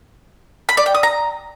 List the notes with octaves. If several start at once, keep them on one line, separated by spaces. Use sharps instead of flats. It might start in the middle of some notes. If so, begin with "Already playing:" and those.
B5
D5
G5
D#6
A#5